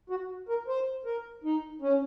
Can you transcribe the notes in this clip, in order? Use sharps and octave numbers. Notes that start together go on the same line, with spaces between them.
F#4
A#4
C5
A#4
D#4
C#4